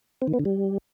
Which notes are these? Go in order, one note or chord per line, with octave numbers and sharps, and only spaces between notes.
C4
D#3
B3
D3
G3